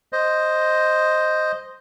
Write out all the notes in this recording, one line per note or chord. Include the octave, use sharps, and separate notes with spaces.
C5 D#5